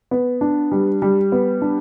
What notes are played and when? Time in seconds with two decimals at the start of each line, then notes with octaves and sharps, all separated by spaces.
0.11 B3
0.41 D4
0.72 G3
1.02 G3
1.32 B3
1.62 D4